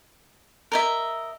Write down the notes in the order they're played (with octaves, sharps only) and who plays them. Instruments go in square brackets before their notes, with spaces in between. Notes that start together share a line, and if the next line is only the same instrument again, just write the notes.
[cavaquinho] A#4 D#5 E5